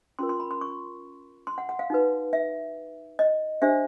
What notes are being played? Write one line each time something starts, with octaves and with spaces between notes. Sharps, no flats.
C#4 F4 A#4 C6
C6
B5
C6
C#6
C6
F#5
F#5
F5
D#4 F#4 B4
E5
D#5
D4 G4 C5 E5